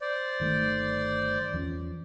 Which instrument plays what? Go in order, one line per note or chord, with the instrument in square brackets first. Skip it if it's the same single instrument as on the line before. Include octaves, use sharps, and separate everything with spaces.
[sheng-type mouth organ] C5 D5
[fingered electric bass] G1 D#3 A3
E2 F3 C#4